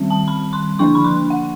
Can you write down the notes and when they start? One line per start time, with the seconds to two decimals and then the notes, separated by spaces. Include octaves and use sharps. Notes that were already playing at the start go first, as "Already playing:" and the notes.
Already playing: D#3 G3 C4
0.10 A5
0.28 B5
0.53 C6
0.79 D3 F3 A#3 D4 C#6
0.95 B5
1.04 C6
1.30 F#5